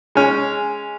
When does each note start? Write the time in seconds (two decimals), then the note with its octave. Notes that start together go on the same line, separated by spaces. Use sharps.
0.15 G#3 C#4